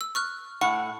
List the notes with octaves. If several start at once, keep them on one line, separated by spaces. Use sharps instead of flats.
E6
C#6 F6 F#6
A2 F#5 C#6